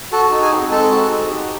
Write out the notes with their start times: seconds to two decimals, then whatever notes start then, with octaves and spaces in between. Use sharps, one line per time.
0.12 F#4 A4 A5
0.31 D#4
0.42 G#4 G#5
0.52 C4
0.71 G#3 A4 A5
0.91 F#4
1.10 D#4
1.30 G4